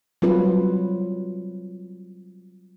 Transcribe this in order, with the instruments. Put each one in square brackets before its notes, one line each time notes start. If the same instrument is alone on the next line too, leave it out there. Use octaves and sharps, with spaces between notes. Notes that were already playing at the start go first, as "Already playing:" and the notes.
[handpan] F#3 G3 C4 F4 B4